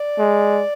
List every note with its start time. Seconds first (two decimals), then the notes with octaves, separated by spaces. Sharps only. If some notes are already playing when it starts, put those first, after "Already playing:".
Already playing: D5
0.19 G#3